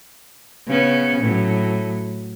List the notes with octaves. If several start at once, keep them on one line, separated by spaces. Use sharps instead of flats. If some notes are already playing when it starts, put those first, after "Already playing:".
C#3 B3 C#4
A2 F#3